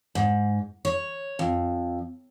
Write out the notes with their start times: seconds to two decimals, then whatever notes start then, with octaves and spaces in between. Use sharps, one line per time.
0.15 G#2
0.85 C#5
1.39 F2